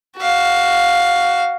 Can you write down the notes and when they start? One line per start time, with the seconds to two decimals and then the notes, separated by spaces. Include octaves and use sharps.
0.18 F#4 F5